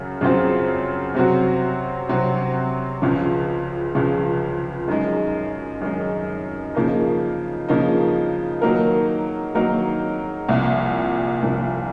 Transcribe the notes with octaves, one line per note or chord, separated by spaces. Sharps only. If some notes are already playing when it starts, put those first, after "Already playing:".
Already playing: F#2 C#3 F#3
F#2 C#3 F#3 C4 F4
C3 F#3 C4 F#4
C3 F#3 C4 F#4
C#2 C#3 F3
C#2 C#3 F3
F#2 D#3 G#3 D#4
F#2 D#3 G#3 D#4
C#3 F3 A#3 D#4
C#3 F3 A#3 D#4
D#3 F#3 A#3 D#4 A#4
D#3 F#3 A#3 D#4 A#4
C2 A#2 F3
C2 A#2 F3